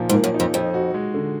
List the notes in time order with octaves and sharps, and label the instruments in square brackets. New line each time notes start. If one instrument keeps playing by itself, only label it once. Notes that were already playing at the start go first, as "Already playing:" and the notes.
Already playing: [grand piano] A#2 F3 D#4
[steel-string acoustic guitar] G#2
[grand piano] A#3
[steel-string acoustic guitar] F#2
[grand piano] D#4
[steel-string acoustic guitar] F2
[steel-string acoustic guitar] F2 [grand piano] D#4
[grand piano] F#4
G#3
D3